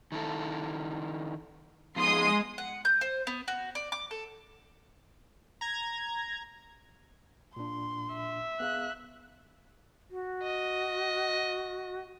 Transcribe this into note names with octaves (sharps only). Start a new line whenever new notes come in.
D#3 E4 A4
F3 G#3 B3 D#4 C6 D#6
F#5
G6
C5
B3
F#4
D5
D6
A4
A#5 G#6
A#2 D4 C6
E5
B3 G#4 F5 F#6
F#4
D#5